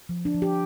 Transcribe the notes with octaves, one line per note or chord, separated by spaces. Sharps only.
F3
D4
F3
G4